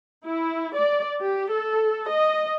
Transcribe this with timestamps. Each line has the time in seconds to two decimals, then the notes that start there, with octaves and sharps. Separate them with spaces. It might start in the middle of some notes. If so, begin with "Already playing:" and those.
0.24 E4
0.76 D5
1.21 G4
1.53 A4
2.10 D#5